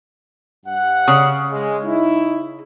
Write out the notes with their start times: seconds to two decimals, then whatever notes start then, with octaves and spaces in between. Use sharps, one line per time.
0.66 G2 F#5
1.08 C#3
1.50 G#3
1.83 D#4 E4